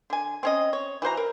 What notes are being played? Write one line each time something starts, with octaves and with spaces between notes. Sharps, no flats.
D3 G#5
C4 C#4 D#5
C#5
E3 F#4 C5 A#5
A#4